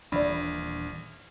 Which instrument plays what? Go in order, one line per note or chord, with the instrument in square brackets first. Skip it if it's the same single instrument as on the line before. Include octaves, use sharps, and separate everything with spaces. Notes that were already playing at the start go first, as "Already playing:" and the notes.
[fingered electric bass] D#1 E3 D4 [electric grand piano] A#1 [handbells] D5 B5